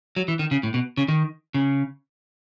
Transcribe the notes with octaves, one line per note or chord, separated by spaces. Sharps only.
F#3
E3
D#3
C#3
A2
B2
C#3
D#3
C#3